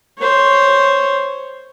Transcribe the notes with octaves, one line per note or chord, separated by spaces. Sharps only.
C5 C#5